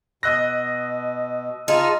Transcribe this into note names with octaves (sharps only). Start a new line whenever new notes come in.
B2 D#5 D#6 E6 F#6 A#6
D#4 F4 G#4 A5 F6